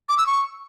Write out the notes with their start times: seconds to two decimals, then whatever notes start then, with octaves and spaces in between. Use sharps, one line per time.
0.09 D6
0.18 E6
0.27 C#6